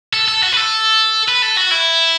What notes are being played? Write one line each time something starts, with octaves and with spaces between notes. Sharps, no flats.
A4
A4
F#4
B4
A4
B4
A4
F#4
E4